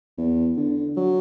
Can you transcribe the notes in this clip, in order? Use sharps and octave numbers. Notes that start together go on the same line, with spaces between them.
E2
D3
F#3